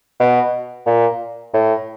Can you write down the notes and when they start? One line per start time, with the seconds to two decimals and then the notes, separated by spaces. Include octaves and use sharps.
0.20 B2
0.86 A#2
1.54 A2